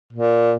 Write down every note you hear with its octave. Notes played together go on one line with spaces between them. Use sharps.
A#2